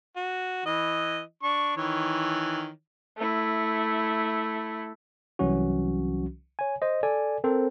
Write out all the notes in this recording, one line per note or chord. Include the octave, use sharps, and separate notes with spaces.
F#4
E3 D#5
D4 C#6
D#3 E3 C#5
A3 E4
C2 E3 F#3 C#4 F#4
C#5 G#5
C5 D#5
A4 D5 G#5
C4 A4 A#4 C5